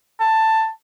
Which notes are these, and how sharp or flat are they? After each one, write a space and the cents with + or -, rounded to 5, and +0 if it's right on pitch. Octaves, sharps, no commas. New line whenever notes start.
A5 +10